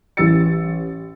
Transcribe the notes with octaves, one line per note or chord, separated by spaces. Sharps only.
A1 E3 G4 E6 A6 C#7